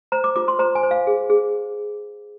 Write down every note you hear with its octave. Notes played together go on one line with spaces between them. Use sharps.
C5 A#5
D6
F4 D6
C6
C5 A#5
G#5
C5
F5
G#4
G#4